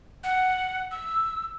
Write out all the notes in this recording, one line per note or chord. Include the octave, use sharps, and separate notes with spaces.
F#5
E6